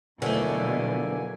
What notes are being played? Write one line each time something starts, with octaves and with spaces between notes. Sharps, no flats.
E2 B2 D3 F3 F#3 A3 A#3 G#5